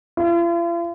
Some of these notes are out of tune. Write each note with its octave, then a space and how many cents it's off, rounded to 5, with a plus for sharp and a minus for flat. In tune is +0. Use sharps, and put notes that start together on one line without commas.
F4 -45